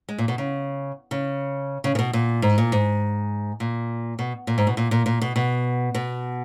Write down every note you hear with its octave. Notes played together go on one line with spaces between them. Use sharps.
G#3
A#2
B2
C#3
C#3
C#3
C#3
B2
A#2
G#2
A#2
G#2
A#2
B2
A#2
G#2
B2
A#2
A#2
A#2
B2
B2
B2